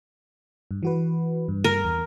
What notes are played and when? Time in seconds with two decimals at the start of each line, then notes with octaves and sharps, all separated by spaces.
0.71 G2
0.83 E3 F#4 B4
1.48 G2
1.64 A#4
1.84 E2